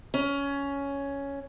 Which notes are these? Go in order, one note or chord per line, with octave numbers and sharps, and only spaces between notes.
C#4